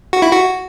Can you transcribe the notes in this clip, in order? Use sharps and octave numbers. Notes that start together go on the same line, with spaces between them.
F#4
E4
F#4